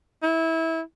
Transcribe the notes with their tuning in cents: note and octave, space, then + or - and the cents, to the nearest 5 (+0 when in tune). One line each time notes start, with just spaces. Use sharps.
E4 -20